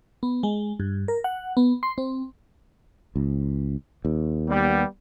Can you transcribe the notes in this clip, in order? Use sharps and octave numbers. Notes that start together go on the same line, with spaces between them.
B3
G#3
G2
A#4
F#5
B3
C6
C4
C#2
D#2
G3 B3